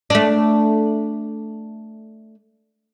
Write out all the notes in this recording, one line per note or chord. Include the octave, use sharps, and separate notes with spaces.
A3 D4